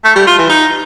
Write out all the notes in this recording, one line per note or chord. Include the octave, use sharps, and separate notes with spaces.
A3
G3
F4
E3
D#4